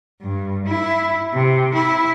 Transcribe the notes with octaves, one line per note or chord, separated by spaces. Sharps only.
G2
E4
C3
E4